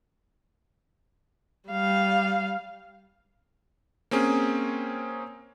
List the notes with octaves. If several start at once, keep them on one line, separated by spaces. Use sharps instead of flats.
G3 F5
A#3 C4 C#4 G#4